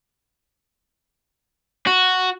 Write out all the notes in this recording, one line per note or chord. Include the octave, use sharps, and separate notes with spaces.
F#4